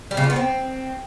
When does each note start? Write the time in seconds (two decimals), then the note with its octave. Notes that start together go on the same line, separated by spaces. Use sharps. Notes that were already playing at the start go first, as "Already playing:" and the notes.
0.11 G3
0.17 C#3
0.23 F4
0.30 B3
0.36 C4